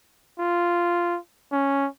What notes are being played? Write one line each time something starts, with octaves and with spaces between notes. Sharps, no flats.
F4
C#4